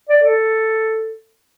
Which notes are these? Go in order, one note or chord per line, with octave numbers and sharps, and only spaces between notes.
D5
A4